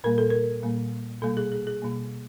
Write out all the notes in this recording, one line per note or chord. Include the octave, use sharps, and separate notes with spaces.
A#2 G3 A#3 A#4
A4
A#4
A#2 G3 A#3
B2 G3 A#3 A4
G#4
G#4
G#4
B2 G3 A#3